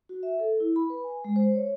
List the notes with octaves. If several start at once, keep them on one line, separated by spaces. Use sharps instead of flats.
F#4
E5
A4
E4
B5
B4
G#5
G#3
C5
C#5